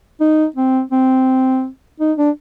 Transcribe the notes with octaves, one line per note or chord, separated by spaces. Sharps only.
D#4
C4
C4
D#4
D4